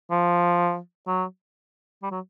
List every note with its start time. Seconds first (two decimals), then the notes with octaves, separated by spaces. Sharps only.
0.11 F3
1.07 F#3
2.03 G3
2.11 F#3